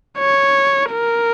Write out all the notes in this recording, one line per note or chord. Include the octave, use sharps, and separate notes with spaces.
C#5
A#4